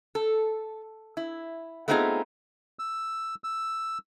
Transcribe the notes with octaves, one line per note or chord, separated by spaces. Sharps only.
A4
E4
A3 B3 C4 D#4 F4 G#4
E6
E6